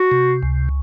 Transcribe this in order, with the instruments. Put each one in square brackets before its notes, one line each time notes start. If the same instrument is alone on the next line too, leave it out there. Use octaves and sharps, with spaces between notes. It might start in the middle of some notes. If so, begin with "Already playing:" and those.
Already playing: [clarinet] F#4
[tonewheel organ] C3
C#2